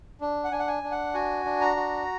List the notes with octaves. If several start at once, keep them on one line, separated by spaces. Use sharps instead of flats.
D4
F#5
D4 G#5
F#5
G#5
D4
F#5
F#4 G#5
D4
A#5
F#4